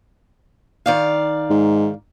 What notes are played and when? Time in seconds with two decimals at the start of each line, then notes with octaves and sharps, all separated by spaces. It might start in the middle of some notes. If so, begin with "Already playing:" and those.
0.86 D#3 D5 F5
1.50 G#2